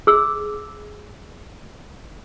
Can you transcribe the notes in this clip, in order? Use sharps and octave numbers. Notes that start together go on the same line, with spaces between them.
G#4 E6